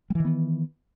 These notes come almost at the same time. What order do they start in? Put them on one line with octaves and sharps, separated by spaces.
G3 E3 D#3 B3